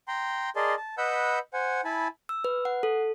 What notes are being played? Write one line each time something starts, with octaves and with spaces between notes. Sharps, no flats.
G5 A#5 C6
G#4 A#4 D5 D#5 A5 C6
A5
B4 D#5 F#5 B5 E6 G6
C5 F#5 G#5
E4 G#5 A5 B5
E6
B4
F#5
A4